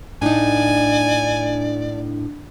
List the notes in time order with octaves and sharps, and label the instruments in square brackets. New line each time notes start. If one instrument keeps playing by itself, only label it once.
[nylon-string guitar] A2 D#4 [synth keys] D4 [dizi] D5 [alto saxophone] G#5